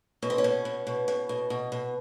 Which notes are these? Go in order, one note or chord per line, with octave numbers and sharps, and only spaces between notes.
B2 C#4
C4
C#4
B2
B2
B2
B2
B2
B2
B2